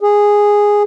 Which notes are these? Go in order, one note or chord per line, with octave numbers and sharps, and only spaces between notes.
G#4